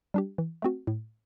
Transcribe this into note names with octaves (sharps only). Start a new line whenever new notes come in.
G3 D4 G4
E3
A3 C4 F#4
A2